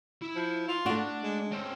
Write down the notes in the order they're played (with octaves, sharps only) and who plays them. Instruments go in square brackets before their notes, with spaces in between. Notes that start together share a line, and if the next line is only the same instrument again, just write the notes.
[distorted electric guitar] E4 B5
[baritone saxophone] F3
F4
[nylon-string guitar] A3 F#4 [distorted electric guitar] D4
[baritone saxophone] G#3
[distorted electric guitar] C4 C#4